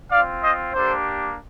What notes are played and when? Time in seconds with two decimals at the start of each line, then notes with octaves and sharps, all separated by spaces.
0.11 C4 F4 D5 F5
0.42 C5 D#5
0.74 A#3 D4 G4 A4 C5